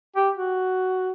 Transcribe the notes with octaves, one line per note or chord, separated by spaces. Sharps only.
G4
F#4